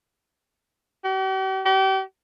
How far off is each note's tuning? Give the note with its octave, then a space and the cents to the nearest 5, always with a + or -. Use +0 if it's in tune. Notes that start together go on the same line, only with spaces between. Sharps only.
G4 -45
G4 -35